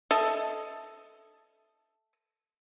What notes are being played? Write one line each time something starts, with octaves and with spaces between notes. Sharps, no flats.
A4 D#5 E5